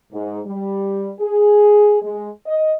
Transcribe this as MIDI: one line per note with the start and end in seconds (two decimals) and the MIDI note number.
0.13 0.39 44
0.46 1.10 55
1.20 1.97 68
2.02 2.30 56
2.47 2.74 75